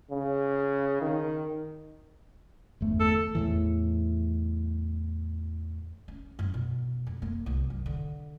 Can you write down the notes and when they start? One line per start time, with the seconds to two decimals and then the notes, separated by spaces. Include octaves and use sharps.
0.11 C#3
1.02 D#3
2.81 G1 E2 A3
3.00 A4
3.35 E2 A2 E3
6.08 C#4
6.39 F#2
6.54 B2
7.07 F2
7.22 A#3
7.46 C2
7.70 F#2
7.86 D3